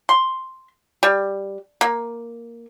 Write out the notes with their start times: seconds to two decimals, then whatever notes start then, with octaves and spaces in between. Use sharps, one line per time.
0.09 C6
1.03 G3
1.81 A#3